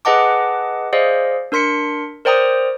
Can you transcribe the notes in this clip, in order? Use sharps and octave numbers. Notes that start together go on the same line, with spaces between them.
G#4 B4 D#5 F#5 A5 D6
G#4 C5 D5 D#5 F5
D4 A#4 C6 B6 C#7
A#4 C5 D5 G5 A#5 D#6